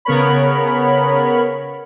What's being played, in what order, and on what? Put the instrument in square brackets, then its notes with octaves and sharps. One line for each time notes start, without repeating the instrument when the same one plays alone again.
[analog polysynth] C#3 B3 A#4 C#5 B5